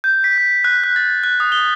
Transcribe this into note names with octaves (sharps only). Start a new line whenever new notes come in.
G6
B6
G6
F#6
F#6
A6
F#6
D#6
G7